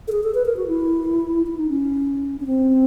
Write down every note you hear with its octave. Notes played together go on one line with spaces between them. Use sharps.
A4
G#4
A4
B4
A#4
F#4
E4
E4
D#4
C#4
C#4
C4